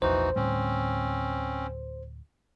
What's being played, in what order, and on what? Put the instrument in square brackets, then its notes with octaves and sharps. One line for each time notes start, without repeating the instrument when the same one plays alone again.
[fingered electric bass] A#1 E2 [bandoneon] E3 D#4 F#4 [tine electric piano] C5
[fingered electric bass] D2 A2 G3 [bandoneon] C4 C#4